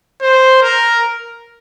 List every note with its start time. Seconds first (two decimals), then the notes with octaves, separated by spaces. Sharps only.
0.22 C5
0.63 A#4